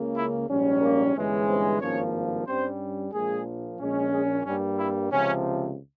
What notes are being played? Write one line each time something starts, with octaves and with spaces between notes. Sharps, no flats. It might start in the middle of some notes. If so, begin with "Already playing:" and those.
Already playing: C#2 C#3 A#3
E4
A#1 G#2 G3 C#4
A#3 A#4
G1 G2 E3 G#3 C#4
C4 C5
G#1 G2 F3 A#3 C#4 C#5
G2 G3 C4 C#4 C5
A#1 A#2 F3 G#3 G#4
A#1 A#2 G#3 C#4
G#3 G#4
G2 G3 A#3 C#4
E4
C#2 C3 F3 C#4